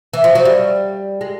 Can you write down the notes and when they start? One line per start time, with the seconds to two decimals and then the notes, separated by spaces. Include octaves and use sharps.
0.13 E3
0.24 F3
0.35 F#3
0.45 G3
1.21 G#3